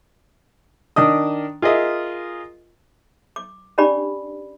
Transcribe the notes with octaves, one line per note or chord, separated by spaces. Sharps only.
D#3 D4 D#5 D#6
F4 G#4 A#4 D#5 E5
D6
C#4 D4 G4 D5 B5